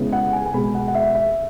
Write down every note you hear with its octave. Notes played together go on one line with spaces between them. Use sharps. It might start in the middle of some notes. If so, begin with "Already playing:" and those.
Already playing: C#3 G#3 B3 E4
F#5
G#5
G#5
B2 G#3 B3 B5
F#5
F#5
E5
E5